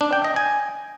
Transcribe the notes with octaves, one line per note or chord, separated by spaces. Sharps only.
D4
G5
D#5
G#5